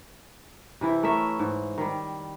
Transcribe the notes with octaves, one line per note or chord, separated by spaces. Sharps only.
C3 E3 E4
A3 A#4 C#5 E5
G#2
D#3 G3